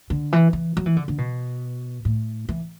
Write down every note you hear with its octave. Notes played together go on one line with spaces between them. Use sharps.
D3
E3
E3
F#3
E3
D3
D3
B2
A2
E3